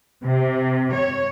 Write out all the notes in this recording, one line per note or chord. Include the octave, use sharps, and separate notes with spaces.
C3
C#5